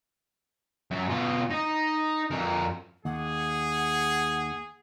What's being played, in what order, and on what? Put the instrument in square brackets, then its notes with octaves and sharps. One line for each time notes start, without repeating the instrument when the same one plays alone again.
[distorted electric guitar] F#2
B2 F4
D#4
F2 A#4
[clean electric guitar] D#2 [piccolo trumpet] G#4 [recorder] F#5